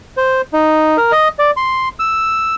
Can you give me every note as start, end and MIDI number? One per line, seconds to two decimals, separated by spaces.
0.17 0.41 72
0.53 0.97 63
0.97 1.12 70
1.12 1.28 75
1.39 1.51 74
1.57 1.89 84
1.99 2.55 88